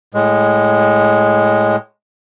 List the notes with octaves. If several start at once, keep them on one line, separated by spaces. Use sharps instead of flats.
A2 G#3